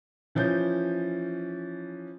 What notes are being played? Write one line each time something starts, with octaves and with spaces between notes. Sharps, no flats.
E3 F3 C#4 G6